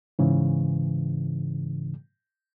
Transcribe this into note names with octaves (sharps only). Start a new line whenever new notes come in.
G#2 C#3 E3